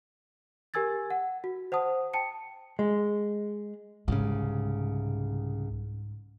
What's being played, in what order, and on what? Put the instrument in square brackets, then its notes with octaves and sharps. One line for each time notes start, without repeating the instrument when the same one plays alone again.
[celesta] G4 A#4 G#5 E6 G#6 A6
F#5
F#4
C5 F#5 A5 D#6
G5 A5 C#7
[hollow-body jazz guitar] G#3
[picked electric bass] C2 C#3 [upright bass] G#2